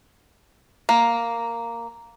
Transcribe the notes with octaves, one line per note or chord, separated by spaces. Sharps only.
A#3